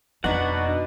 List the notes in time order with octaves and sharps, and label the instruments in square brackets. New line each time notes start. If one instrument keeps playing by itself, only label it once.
[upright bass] F2 [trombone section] B2 [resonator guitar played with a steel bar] B3 D#4 [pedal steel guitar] D4 F#4 F#5